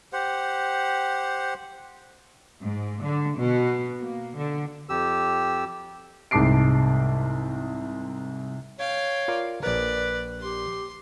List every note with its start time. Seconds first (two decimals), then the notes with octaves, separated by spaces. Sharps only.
0.13 G4 C5 F#5
2.62 G#2
3.02 D3
3.38 B2
4.00 A#3
4.36 D3
4.89 F2 G4 E6
6.31 C2 G#2 A5 D6 C7 D7
8.79 C#5 F5 G5
9.28 F4 A#4 D5
9.63 A#1 A#4 B4 D5
10.41 G4 C6